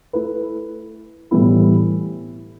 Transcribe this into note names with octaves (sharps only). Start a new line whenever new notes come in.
A3 E4 B4
A2 E3 G3 B3 E4